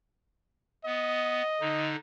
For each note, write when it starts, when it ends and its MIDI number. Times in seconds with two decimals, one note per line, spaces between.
0.85 1.42 59
0.85 1.93 75
1.61 1.96 50
1.61 1.96 63